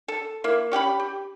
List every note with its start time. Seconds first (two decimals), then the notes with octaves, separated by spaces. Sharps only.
0.08 A4
0.44 A#3 E4
0.71 C#4 G4 F#5 B5
1.00 G4